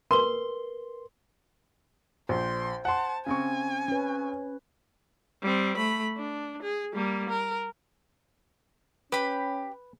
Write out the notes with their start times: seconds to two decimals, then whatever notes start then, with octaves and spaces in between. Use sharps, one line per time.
0.11 A#4 B4 C6 G7
2.29 A#1 C5 C6
2.85 F#5 A5 C6
3.26 C#3 C4 G#5 C#6
3.88 C#4 B4
5.42 G3 C4
5.77 A3 B5
6.17 D4
6.63 G#4
6.94 G3 A#3
7.29 A#4
9.12 C#4 G4 B4 B5